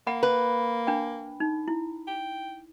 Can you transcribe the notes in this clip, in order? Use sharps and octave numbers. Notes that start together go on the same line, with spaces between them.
A#3 F#5 B5
B4
D4 G5
D#4
E4
G5